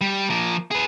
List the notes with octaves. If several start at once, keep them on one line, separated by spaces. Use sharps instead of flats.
G3
F3 A#3
G#4 B4